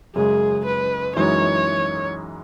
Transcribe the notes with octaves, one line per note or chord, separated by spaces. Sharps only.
F#2 C#3 G#3 G#4
B4
F#2 E3 G#3 D#4 F#4 C#5